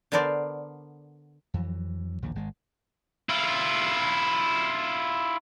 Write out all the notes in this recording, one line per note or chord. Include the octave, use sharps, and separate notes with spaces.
D3 B3 D4 A#4 C5 D5
F2 E3 F#3
A#1 D#2 A#2 D3
G#1 G#3
E4 F4